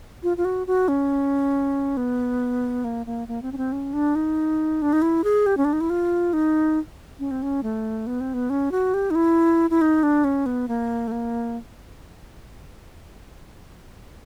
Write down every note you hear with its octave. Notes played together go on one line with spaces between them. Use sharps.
F4
F4
F#4
F#4
C#4
B3
A#3
A#3
A#3
C4
C#4
C4
C#4
D4
D#4
D4
D#4
E4
G#4
G4
C#4
D4
D#4
E4
F4
D#4
C#4
C4
C#4
A3
B3
C4
B3
C#4
F#4
G4
D#4
E4
E4
D#4
D4
C#4
B3
A#3
A3
A#3